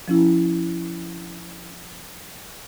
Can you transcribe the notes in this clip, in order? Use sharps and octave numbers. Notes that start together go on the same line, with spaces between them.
F3 C#4 E4